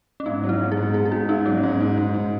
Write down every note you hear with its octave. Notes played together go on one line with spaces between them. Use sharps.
C#4
G#2 D#4
F#3
E4
G#2
G#4
G#2
G#2 G#4
G#4
G#2 F#4
G#2 D#4
F#3 C#4
G#2
G#2
G#2
G#2